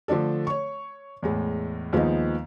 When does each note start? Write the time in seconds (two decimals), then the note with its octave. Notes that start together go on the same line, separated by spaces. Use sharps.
0.08 D3 F3 A3 D4 A4
0.47 C#5 C#6
1.22 E2 A2 G#3
1.93 D#2 F3 G#3 B3 D#4